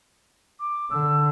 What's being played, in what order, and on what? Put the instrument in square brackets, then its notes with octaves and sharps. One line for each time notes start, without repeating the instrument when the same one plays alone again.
[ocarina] D6
[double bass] D3 [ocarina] E6